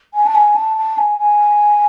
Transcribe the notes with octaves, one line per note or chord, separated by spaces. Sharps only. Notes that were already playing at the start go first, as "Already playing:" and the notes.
G#5
A5
G#5
A5
A5
G#5
G#5